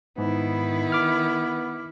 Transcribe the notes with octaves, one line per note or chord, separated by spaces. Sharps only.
G#2 D#3 B3 E4
D6 F6